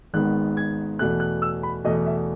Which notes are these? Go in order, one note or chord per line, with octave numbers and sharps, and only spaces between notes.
G#1 G#2 D#3 G#3 B3 F#6
G#6
E2 B2 A3 F#6
F#6
E6
B5
E2 B2 A3 D#5
E5